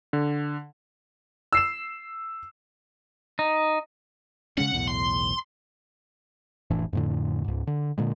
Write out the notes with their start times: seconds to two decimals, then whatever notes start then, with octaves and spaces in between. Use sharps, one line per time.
0.13 D3
1.53 E6 C7 E7
3.39 D#4
4.58 C#3 G#3 C#4 F#5
4.74 B1 E2 A2
4.87 C6
6.70 F1 A2 E3 D4
6.93 F2 A2 D3
7.44 C#2 G#2
7.67 D3
7.98 A#2 D3 G#3